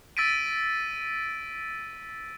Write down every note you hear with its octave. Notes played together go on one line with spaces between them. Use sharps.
E6 A6 B6 D7 D#7